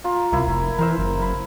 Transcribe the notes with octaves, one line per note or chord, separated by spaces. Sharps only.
F4 A#5
C2 A#3 E4
F1
E3 A#4 C5 E5
F#1
B5